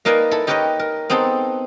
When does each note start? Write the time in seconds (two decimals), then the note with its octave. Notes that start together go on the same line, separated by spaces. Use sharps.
0.05 A#3 D#4 A#4 B4 D5 G#5
0.31 E4 A4
0.47 D#4 G4 A#4 B4 C#5 D#5
0.79 A#4
1.10 B3 C4 D#4 G#4 A4